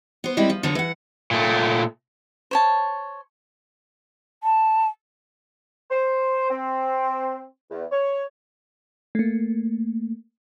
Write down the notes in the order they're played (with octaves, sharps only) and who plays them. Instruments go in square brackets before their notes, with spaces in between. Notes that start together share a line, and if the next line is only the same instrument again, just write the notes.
[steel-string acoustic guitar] B3 C5
G3 G#3 C4 E4
F3
D3 F3 F#3 B3
E3 F#5
[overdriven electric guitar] A#2 A3
[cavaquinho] C5 C#5 A5
[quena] A5
[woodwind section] C5
C4
E2
C#5
[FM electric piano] A3 A#3